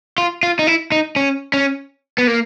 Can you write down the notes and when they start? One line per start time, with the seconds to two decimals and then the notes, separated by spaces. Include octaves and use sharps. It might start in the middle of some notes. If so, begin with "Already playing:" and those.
0.18 F4
0.43 F4
0.59 D#4
0.67 E4
0.92 D#4
1.16 C#4
1.54 C#4
2.18 B3
2.27 A#3